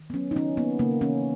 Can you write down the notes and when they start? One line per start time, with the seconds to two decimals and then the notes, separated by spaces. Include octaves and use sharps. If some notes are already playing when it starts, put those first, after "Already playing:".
Already playing: D#3
0.10 B3
0.14 F#3 C#4
0.31 D#4
0.36 D#3 C#4
0.57 A#3 B3
0.79 C#3 A#3
1.01 E3 C#4